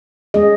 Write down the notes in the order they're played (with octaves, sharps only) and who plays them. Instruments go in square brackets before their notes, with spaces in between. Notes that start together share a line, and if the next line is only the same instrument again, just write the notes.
[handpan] G#3 C#4 G#4 D#5